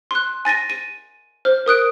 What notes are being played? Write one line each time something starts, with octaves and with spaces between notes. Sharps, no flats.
C6 F#6
G#5 A6 A#6 D#7
D#7
C5 F6
A#4 D#6 F#6 D7